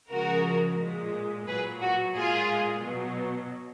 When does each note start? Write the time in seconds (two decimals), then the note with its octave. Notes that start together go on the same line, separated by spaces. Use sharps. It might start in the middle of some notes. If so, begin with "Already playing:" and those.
0.11 C#3 F3 G#3 F#4 A#4
0.80 A#2 G#3
1.48 A#2 F#3 G#4 B4
1.81 F#4
2.15 A#2 G#3 F4 G#4
2.83 B2 F#3